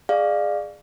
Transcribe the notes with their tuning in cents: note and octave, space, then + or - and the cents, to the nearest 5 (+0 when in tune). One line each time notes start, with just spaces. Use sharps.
G#4 +0 D5 +25 F5 +0